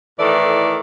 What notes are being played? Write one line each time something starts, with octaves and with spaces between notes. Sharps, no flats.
A2 D#3 E3 A4 D5